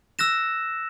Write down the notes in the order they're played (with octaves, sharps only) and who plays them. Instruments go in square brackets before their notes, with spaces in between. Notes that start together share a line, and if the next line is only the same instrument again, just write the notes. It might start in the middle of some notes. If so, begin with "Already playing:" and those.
[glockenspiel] E6 F#6 A#6 E7